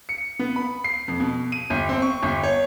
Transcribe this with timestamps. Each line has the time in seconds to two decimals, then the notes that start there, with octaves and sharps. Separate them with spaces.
0.09 C#7
0.39 B3
0.56 B5
0.84 C7
1.08 F2
1.20 B2
1.52 D#7
1.70 G1
1.89 C4
2.02 C#6
2.22 G1
2.43 C#5